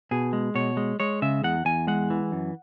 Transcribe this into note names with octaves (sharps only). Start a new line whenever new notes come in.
B2 G#4
G#3
B2 C#5
G#3
G#3 C#5
C#3 E5
E2 F#5
E2 G#5
G#3 F#5
E3
F#2